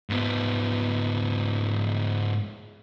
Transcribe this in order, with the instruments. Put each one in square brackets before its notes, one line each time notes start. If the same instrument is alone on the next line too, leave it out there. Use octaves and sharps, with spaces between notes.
[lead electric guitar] G#2 B3